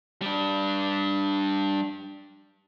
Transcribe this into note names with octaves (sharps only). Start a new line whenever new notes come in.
G3 D4